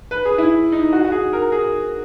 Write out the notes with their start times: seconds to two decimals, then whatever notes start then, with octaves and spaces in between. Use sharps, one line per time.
0.11 B4
0.25 G#4
0.38 E4
0.72 D#4
0.93 F#4
1.05 F#4
1.12 G#4
1.33 A#4
1.52 G#4